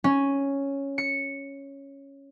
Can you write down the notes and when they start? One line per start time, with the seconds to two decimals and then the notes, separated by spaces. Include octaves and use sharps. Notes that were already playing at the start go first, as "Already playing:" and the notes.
0.04 C#4
0.98 C#7